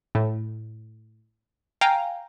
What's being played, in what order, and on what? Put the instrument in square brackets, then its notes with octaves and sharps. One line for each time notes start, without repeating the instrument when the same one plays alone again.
[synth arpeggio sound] A2
F5 G5 G#5 A#5